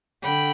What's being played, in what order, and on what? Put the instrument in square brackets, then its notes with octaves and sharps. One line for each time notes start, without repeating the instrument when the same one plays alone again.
[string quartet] D3 G5 B5